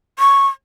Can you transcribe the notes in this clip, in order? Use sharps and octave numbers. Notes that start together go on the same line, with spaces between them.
C#6